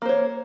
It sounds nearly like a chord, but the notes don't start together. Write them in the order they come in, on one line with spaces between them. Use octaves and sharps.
A#3 C5 C#5